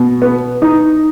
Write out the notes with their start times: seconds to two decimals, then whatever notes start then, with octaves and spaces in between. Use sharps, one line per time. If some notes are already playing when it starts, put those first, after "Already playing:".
Already playing: B2
0.22 B3
0.62 D#4